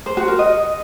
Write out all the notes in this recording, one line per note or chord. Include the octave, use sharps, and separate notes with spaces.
C5
F#4
A#4
D#5